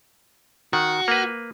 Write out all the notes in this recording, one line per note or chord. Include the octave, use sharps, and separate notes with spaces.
D#3 F#4
A#3 B4